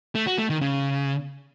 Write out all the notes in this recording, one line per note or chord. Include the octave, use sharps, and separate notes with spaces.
A3
F#4
A3
D#3
C#3